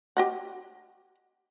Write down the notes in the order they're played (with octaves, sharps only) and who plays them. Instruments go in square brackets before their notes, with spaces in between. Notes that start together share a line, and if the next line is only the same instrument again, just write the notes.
[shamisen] G4 D#5 F#5